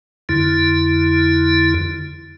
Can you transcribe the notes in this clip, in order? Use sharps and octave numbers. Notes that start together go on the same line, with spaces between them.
F2 D3 E4